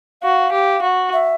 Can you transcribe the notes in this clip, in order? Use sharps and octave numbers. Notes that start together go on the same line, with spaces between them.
F#4 F5
G4
F#4
E5